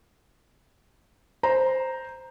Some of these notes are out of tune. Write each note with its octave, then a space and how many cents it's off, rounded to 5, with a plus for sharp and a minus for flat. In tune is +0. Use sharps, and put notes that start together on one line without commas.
C5 +0 A#5 +0